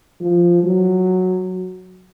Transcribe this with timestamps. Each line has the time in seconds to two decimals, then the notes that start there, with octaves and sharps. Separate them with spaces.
0.20 F3
0.63 F#3